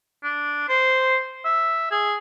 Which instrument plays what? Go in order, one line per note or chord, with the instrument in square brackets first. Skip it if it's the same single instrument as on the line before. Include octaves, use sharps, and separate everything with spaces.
[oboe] D4
C5
E5
G#4